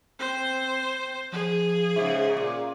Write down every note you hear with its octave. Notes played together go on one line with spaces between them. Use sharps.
C4 C5
F3 G#4
G#2 C#3 E5
A#2 D6